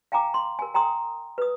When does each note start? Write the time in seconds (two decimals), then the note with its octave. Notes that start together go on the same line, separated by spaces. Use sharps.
0.12 F5 G5 G#5 A#5 D6
0.34 C6
0.59 A#4 G#5
0.74 G5 A#5 C6 D#6
1.38 B4 D#6